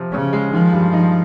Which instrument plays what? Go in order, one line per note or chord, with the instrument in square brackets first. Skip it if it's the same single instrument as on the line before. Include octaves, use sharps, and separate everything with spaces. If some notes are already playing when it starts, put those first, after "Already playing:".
Already playing: [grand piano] C3 F3
[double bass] C#3 [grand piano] C#4
[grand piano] G#3
[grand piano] D#3 [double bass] F3
[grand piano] G2
D#4